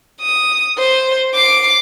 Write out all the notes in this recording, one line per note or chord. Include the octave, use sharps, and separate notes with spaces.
D#6
C5
D6 C7